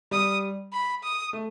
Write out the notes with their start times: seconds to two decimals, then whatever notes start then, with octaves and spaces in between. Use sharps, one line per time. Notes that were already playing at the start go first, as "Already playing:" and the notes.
0.11 G3 D#6
0.73 B5
1.03 D#6
1.33 A3